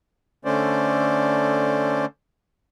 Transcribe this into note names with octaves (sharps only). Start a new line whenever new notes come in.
D3 A3 C#4 C5 D5